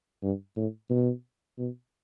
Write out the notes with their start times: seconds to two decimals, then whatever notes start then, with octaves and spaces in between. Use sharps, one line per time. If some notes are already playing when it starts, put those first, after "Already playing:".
0.23 G2
0.56 A2
0.90 B2
1.58 B2